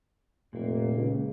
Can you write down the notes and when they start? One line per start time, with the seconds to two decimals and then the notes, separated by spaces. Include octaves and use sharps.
0.53 F1 A#2 A#3
0.93 C#2